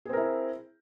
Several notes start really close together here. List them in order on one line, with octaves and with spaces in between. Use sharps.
G#4 C4 A#4 E4